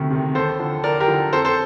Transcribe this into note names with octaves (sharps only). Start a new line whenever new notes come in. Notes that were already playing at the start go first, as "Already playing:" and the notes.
Already playing: D2 C3 D#3
C3 D#3
D#2 A4 C5
D3 F3
D#2 A#4 D5
G4 A#4
D3 F3
F2 A4 C5
A4 C5